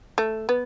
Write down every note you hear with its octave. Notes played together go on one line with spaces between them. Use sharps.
A3
B3